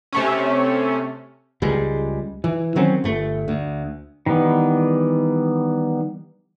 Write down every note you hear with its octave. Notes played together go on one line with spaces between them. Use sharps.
C3 A3 C#4
C#2 G3 G#3
E3
D#3 F#3 C4 C#4
G1 A3
D2
D#3 E3 G3 B3